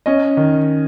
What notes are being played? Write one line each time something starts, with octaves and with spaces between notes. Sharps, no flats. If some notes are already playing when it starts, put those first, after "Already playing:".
C#4 D#5
D#3